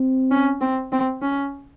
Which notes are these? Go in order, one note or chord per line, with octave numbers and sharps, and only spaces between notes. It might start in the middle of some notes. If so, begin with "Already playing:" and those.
Already playing: C4
C#4
C4
C4
C#4